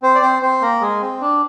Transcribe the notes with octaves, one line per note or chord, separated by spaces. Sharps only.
C4 C5
D5
C4 C5
C4 C5
A#3 A#4
G#3 G#4
C4
D4